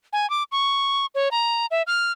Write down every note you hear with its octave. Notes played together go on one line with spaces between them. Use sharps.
G#5
D6
C#6
C#5
A#5
E5
F6